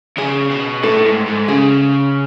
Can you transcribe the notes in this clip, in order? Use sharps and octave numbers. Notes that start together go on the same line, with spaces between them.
C#3 G#4
B2
A2 A4
G#2
G#2
C#3 G#4